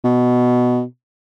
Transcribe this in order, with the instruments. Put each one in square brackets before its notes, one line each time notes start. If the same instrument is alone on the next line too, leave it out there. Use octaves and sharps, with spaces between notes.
[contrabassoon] B2